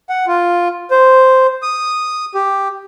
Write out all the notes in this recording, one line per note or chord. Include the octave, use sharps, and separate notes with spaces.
F#5
F4
C5
D#6
G4